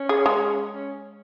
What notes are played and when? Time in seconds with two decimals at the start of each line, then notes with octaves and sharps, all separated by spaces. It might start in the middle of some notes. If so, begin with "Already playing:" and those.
Already playing: C#4
0.09 G#4
0.26 G#3
0.42 C#4
0.74 C#4